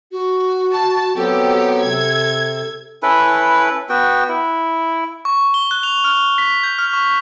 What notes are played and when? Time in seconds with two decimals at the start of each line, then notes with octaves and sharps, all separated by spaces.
0.12 F#4
0.73 A5
1.16 F#3 B3 C4 G4 A4
1.83 C3 G#6
3.03 C#4 E4 A4 B4
3.89 B3 F#4 G5
4.29 E4
5.25 C#6
5.54 G7
5.71 F#6
5.83 F7
6.04 F6
6.38 B6
6.63 G6
6.79 F6
6.93 C#6